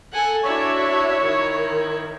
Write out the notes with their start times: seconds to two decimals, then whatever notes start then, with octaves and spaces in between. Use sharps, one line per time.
0.13 A4 F#5 G#5
0.43 D4 E4 F#4 C#5 E5 C#6
1.25 D#3